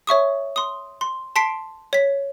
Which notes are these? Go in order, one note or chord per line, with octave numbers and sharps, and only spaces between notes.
C#5 E5 C#6 D#6
C6 D#6
C6
A5 C6 B6 C7 D7
C#5 B6